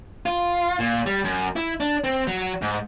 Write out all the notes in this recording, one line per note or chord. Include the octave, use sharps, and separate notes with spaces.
F4
A#2
G3
F#2
E4
D4
C4
F#3
G#2